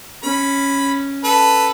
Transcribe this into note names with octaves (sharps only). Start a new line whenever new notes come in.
C#4 B5
A4 B4